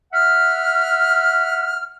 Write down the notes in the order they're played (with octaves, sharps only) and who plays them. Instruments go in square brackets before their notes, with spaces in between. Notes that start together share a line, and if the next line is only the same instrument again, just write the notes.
[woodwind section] E5 F#5 F6